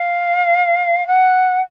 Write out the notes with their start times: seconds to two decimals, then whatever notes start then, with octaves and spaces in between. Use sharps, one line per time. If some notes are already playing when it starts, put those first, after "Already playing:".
Already playing: F5
1.07 F#5